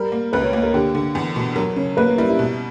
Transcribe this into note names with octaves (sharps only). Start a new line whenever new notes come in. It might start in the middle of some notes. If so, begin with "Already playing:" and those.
Already playing: G3 A#4
A#3
C#2 B4
C#5
A#3 C#5
A#4
D3 G4
D3
E2
B2
F#3 A#4
C#3 C#5
A#3 B4
A#4
G3 E4
E4
B2